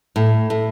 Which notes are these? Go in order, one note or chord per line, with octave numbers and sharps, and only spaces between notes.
A2
A2